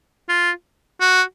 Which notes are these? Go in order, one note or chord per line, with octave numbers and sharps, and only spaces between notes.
F4
F#4